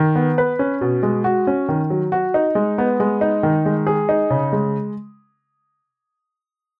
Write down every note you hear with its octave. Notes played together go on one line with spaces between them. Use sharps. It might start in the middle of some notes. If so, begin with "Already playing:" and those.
Already playing: D#3
B3
B4
C#4
B2
G#3
F#4
C#4
D#3
F#3
F#4
D#4
G#3
B3
G#3
D#4
D#3
G#3
G#4
D#4
C#3
G#3